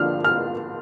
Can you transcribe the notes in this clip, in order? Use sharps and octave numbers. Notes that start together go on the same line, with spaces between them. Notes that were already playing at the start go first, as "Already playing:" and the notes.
Already playing: D3 F3 D4 F6
F6